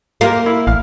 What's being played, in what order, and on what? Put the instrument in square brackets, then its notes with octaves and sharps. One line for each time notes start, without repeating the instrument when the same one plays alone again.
[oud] A#3 [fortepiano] F4 G4 A#4
[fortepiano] E4
[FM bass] A1 [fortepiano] F5